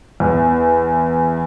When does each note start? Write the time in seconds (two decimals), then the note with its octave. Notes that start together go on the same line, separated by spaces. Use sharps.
0.20 E2